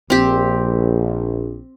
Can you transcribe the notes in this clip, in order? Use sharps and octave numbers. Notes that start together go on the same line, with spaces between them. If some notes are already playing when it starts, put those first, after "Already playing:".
A#1 C4 G4